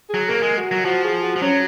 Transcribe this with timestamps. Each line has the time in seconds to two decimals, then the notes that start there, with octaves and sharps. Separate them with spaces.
0.10 F#3 G#4
0.28 A#3 A#4
0.43 G#3
0.57 F#4
0.71 F#3
0.85 F3 F#4
1.04 G#4
1.23 F#4
1.36 F3
1.42 F#3 C#4